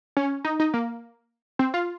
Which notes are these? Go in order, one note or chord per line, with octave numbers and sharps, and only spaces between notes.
C#4
D#4
D#4
A#3
C4
F4